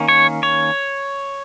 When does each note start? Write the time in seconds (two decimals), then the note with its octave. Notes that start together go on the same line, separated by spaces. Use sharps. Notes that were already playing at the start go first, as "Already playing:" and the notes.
Already playing: D#3 A#3 C#4
0.08 C#5
0.43 C#5